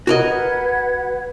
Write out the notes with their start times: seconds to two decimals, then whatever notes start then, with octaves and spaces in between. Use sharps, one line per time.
0.07 F#4 A#4 B4 D#5 F#5 G#6